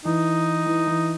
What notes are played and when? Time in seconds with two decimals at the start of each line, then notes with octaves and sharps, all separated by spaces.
0.05 E3 D#4
0.66 E3
0.87 E3